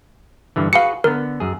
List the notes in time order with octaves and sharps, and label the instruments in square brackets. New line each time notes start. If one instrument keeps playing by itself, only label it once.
[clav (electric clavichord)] G2 D3 E3
[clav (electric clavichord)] F#4 G#4 B4 [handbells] F5 C#7
[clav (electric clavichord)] D3 B3 [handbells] A#4
[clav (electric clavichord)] F#2 G#4